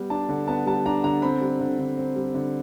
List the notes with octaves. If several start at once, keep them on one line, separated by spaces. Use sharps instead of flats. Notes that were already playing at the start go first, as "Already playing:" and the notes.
Already playing: G3 B3
D4 A5
D3
B3 A5
G3 A5
D4 A#5
D3 A#5
C4 B5
G3
D3
D3
C4
G3
D3